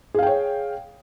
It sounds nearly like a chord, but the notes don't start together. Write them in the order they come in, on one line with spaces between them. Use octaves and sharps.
G#4 F5 G5 C#5